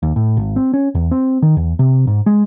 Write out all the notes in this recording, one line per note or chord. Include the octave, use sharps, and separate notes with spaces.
D#2
A2
G#1
C4
C#4
E2
C4
D#3
E2
C3
G#2
G#3